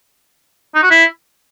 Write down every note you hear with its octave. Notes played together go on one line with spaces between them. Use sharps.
D#4
F#4
E4